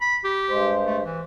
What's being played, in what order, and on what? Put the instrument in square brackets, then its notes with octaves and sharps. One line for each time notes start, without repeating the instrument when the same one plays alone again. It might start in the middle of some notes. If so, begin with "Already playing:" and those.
[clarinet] B5
G4
[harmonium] G2 G#3 C5
[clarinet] A3
E3